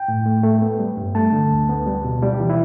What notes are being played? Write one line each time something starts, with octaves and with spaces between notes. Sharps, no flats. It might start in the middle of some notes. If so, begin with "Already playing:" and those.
Already playing: G5
A2
A3
A3
B3
G3
G2
A3 A5
D3
D2
B3
G3
B2
G3 G4
E3
E4